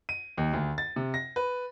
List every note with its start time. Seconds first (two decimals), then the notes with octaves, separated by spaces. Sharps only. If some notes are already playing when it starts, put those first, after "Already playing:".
0.09 D#7
0.38 D#2
0.53 D2
0.78 A6
0.96 C3
1.14 A#6
1.36 B4